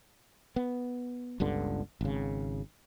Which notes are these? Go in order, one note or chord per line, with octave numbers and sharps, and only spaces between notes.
B3
G1 C#2 G2 D3
G#1 C#3